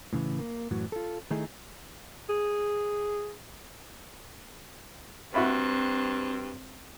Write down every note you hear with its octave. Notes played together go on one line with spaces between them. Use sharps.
A2 C#3 E3
A#3
F#2 A2 E3 F#3
F4 A4
D#3 A3 D#4 E4 G#4
G#4
G2 C4 F#4 E5 B5